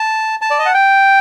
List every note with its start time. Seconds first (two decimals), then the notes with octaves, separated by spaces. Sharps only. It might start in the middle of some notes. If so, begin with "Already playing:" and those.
Already playing: A5
0.42 A5
0.51 D5
0.59 D#5
0.65 F#5
0.74 G5